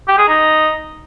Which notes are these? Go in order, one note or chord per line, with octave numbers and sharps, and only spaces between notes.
G4
G#4
D#4